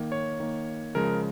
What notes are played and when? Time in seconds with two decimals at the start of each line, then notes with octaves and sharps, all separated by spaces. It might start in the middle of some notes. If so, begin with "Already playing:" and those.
Already playing: D#3 A#3
0.12 C#5
0.40 D#3 A#3
0.95 C#3 F3 G#3 A#4